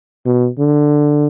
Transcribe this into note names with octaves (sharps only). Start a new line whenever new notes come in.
B2
D3